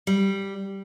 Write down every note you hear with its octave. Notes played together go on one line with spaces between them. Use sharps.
G3